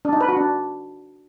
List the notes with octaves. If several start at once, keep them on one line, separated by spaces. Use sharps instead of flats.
D4
D#4
B4
F#4
D4